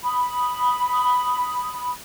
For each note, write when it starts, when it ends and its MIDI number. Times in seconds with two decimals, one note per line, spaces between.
0.03 1.91 83
0.03 1.91 87